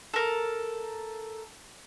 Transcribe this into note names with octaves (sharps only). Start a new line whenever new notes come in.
A4 A#4